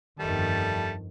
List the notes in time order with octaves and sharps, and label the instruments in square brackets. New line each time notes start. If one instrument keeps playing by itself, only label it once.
[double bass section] G1 F2 D#3 [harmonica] G3 A3 A5